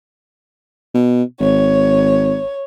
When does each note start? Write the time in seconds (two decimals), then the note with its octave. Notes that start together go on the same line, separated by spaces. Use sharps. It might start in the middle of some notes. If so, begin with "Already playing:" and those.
0.95 B2
1.40 G#1 C#5